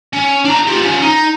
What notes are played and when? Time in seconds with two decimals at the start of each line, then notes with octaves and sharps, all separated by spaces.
0.13 C#4
0.45 D4 A#5
0.67 F4 G4
0.82 F3 C#4
1.02 D#4